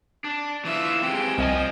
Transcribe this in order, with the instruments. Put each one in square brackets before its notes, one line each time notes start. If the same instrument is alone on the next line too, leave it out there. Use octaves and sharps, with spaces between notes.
[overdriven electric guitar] D4
[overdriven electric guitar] E3 F4 [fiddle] E5
[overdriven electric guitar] C3 G#3 [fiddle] G5
[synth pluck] C2 D#5 G#5 [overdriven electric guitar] F3